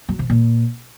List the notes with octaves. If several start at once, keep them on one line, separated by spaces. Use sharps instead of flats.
F#3
C3
A#2